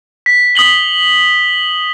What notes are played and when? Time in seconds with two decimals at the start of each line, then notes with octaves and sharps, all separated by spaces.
0.26 B6
0.55 D#6 B6 F#7 G7